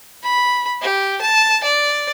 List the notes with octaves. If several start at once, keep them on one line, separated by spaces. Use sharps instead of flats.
B5
G4
A5
D5